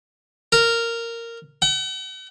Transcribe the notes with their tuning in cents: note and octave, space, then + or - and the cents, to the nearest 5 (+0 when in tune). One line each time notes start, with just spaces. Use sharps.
A#4 -10
F#5 +45